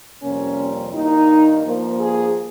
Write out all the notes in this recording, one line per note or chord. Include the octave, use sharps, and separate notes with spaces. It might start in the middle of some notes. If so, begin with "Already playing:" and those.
F2 C3 G3 A#3 C#4
G2 D#3 A#3 D#4
G2 F3 A#3
G#4